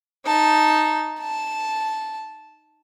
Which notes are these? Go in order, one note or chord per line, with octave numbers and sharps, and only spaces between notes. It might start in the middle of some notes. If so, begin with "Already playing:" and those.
D#4 A5
A5